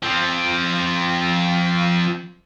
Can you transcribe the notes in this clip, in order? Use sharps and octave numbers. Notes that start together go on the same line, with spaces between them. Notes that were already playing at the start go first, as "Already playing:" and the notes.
F3 C4